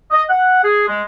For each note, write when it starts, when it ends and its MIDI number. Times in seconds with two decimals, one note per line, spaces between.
0.11 0.22 75
0.29 0.63 78
0.64 0.87 68
0.88 1.02 56